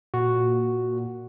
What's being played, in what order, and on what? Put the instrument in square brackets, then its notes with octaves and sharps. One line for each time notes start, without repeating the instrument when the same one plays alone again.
[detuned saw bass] A#2 [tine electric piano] F#4